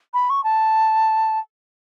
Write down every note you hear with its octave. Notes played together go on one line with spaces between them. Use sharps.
B5
C#6
A5